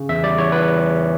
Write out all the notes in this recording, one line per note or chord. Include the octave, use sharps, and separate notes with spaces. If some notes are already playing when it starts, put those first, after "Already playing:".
Already playing: C#3
E2 E5
G3 D5
E2 C#5
E2 B4